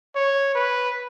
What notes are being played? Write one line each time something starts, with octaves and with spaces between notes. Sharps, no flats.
C#5
B4